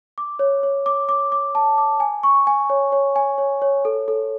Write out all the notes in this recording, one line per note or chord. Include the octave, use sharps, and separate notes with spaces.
D6
C#5
C#5
D6
D6
D6
A5
D6
G#5
C#6
G#5
C#5
C#5
G#5
C#5
C#5
A4
A4